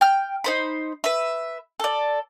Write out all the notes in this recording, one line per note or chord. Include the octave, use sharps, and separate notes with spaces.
G5 F6
D#4 C5 B5
B4 E5
A4 D5